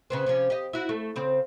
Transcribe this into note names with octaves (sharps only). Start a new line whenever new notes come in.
C#3 B3 C4
C3 F3 C#4
G4 D#5
E4 F#4
A3
C#3 C4